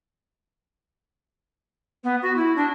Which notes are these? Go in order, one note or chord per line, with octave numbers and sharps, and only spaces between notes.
B3
F#4
E4
D4